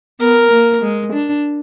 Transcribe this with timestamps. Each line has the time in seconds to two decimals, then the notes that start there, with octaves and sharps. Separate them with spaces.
0.20 B3 A#4
0.51 A#3
0.82 G#3
1.12 D4